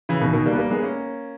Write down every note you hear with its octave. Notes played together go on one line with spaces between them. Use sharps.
C#3 E3
B2 D#3
B2 D#3
G3 A#3
B3
G3 A#3
G#3 B3
A#3 C#4